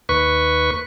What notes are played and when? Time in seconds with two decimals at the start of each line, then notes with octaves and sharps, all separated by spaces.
0.09 D#2 B4 C#6